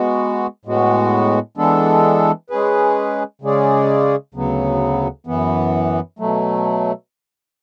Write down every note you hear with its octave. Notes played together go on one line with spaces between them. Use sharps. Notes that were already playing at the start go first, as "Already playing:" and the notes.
Already playing: G#3 B3 F#4
A2 G#3 B3 F#4
E3 G#3 B3 D4 A4
G#3 C#4 G#4 B4
C#3 G#3 C#4 G#4 D5
D2 C#3 F#3 B3
F#2 E3 B3
B2 F#3 A3